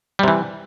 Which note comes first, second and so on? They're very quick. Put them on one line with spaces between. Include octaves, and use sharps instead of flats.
G3 C3 E3